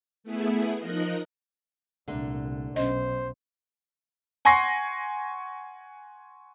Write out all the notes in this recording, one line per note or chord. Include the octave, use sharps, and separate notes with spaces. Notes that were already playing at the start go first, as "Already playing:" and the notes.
A3 B3 E4 G#4
F3 D#4 A#4 D#5 F#6
C2 A#2 D3 A3 A#3
B1 C#4 C5 D#5
F#5 G#5 C6 C#6 A#6 C7